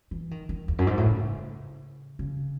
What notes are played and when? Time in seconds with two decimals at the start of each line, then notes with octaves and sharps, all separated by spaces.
0.11 E3
0.31 D#3
0.49 D#3
0.68 E2
0.79 F#2
0.87 G#2
0.97 A2
1.06 C#3
2.19 C#3